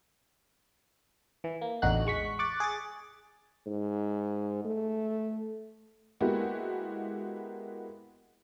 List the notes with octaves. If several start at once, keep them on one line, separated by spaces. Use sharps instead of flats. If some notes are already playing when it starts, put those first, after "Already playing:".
E3
A#3
A1 E2 D3 D#4 F#4 F#6
G#3 C#6 B6
C#6 D6 F#6 A6
G#4 D6 A6
G#2
A3
G#3 A#3 B3 E4 F#4 G4